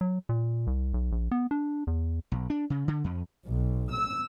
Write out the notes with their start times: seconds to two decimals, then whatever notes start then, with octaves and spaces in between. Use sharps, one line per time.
0.01 F#3
0.29 A#2
0.67 C2
0.94 B1
1.12 A#1
1.31 B3
1.51 D4
1.87 E2
2.32 B1
2.50 D4
2.70 C#3
2.88 D3
3.04 F2
3.48 B1
3.92 E6